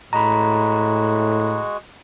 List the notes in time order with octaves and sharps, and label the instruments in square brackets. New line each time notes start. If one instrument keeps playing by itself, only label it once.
[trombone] A2 [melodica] G#3 F#4 [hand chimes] A#5 B5